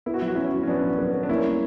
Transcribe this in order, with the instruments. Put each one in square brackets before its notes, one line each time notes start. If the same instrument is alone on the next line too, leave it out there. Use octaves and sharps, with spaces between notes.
[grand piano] B3 [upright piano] E4
[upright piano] F#4
[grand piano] F#3 [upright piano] E4
[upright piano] F#4
[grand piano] F#3 [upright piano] C#4 E4
[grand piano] F#4
[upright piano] C#4
[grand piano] F#3 [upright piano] B3 D4
[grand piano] F#3
B3
B3
[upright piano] D4
[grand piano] A#3 [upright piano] C#4 E4
[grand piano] G3